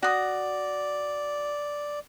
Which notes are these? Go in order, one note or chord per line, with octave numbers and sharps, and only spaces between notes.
F#4 D5 D#6